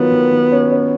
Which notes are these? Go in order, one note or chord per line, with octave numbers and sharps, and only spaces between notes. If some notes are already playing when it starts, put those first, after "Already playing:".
Already playing: D#3 F#3 B3 F4
D#3
D#3
C#4
C#4